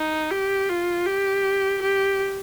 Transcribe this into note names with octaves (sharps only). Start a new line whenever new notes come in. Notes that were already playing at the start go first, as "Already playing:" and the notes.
Already playing: D#4
G4
F4
G4
G4